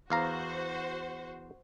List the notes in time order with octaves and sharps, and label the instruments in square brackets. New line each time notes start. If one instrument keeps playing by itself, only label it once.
[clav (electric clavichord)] E2 F5 A#5 [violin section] F#4 C5